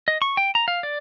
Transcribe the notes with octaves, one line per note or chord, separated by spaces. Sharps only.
D#5
C#6
G5
A#5
F5
D5